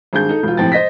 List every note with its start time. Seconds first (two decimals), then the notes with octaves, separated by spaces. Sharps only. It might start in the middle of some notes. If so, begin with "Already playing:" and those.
0.13 G#1 G2 G#4 G6
0.29 D#4 A4
0.43 E1 F4
0.57 A2 C3 F3 G5 A6
0.72 C5 D#5 A#6 B6